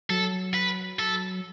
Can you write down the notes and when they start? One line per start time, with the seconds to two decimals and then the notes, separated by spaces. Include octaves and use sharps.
0.10 F#3 A4
0.54 B4
0.99 A4